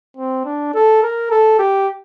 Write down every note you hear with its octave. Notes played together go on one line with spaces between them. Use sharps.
C4
D4
A4
A#4
A4
G4